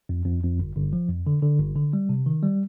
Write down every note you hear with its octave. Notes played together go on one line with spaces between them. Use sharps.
F2
F2
F2
G1
G1
F3
F2
D3
D3
G1
D3
G3
C3
D#3
G3